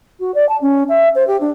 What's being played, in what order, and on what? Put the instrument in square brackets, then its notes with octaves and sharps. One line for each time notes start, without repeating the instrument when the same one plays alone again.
[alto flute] F#4
D5
A5
C#4
E5
C5
G4
D4